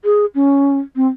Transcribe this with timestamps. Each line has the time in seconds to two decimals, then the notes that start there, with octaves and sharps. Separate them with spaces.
0.04 G#4
0.35 C#4
0.96 C4